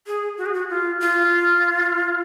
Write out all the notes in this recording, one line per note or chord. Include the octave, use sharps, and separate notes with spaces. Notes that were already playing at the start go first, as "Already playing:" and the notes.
G#4
F#4
G#4
F#4
F4
F4